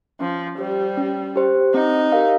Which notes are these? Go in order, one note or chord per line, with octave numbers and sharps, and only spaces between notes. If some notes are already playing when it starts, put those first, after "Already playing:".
F3 C#4
G3 G4 C5
C#4
G4 C5
C4 D#4
G4 A#4 F5